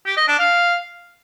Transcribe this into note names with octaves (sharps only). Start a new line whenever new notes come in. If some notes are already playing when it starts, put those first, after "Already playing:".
G4
D#5
D4
F5